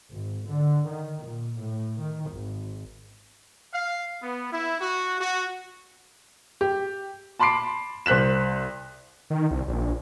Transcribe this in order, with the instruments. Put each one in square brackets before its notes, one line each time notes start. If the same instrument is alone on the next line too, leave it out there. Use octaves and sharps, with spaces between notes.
[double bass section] G#1
D3
D#3
A#2
A2
D#3
G#1
[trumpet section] F5
B3
E4
F#4
F#4
[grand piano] G4
A5 B5 C6 D6 C7 D7
C2 C5 F#6 B6 E7
[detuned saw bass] D#3
C2
A#1